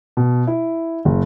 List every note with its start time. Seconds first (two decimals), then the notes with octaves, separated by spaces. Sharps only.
0.17 B2
0.47 E4
1.05 F#1